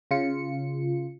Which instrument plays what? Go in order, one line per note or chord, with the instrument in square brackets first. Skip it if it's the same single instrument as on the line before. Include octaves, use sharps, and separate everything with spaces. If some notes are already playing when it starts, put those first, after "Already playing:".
[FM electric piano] C#3 F4 C#7